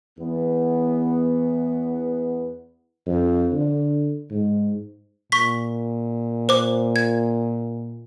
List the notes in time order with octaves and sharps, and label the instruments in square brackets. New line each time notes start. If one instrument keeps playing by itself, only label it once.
[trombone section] E2 B3
[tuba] F2
D3
G#2
[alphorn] A#2 [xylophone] C#6 B6
[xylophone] C5 D6
G#6